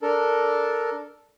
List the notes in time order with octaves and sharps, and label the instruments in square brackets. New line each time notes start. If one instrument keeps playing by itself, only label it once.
[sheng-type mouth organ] D4 A4 A#4